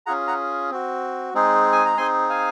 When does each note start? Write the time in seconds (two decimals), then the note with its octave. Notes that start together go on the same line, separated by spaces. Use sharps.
0.06 C#4 F4 G#4 F#5 A#5
0.27 F#5 A#5
0.70 C4 F#4
1.34 G#3 C4 D#4 G#4
1.72 G#5
1.85 A#5
1.97 C4 D#4 G#4 G#5 C6
2.29 F5 G#5